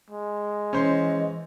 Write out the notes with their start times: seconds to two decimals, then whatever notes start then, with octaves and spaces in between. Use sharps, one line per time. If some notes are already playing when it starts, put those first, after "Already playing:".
0.10 G#3
0.73 E3 C#4 C5 D#5